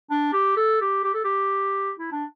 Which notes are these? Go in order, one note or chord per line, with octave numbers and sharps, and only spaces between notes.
D4
G4
A4
G4
G4
A4
G4
E4
D4